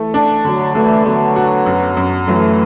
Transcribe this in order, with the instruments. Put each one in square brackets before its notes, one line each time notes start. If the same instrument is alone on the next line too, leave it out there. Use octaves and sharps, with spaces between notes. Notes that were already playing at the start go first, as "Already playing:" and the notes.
Already playing: [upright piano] E3 A3 A4
D4
[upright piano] D3 [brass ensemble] F#3
[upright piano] D3 [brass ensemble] E3 A3
[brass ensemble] F#3 B3 [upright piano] A3
[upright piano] F#4
F#2
F#2
[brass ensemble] E3 A3 [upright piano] F#3